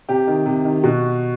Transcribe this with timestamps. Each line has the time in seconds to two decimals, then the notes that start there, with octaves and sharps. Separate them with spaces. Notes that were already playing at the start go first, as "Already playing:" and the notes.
0.08 C3 G4
0.27 D#3
0.46 C3
0.65 D#3
0.83 B2 F#4